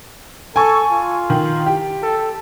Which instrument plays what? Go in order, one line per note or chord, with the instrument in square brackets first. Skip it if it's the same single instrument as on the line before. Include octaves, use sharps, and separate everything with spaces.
[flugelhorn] A4 [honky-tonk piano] G#5 C#6
[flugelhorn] F4
[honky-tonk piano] D#3
G4
[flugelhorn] A4